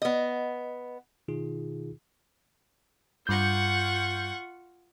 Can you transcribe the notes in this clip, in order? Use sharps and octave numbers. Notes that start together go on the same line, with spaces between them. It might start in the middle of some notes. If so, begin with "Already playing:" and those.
B3 D#5
B2 D#3 D#4 F4 G#4
G2 F4 F#5 C#6 G6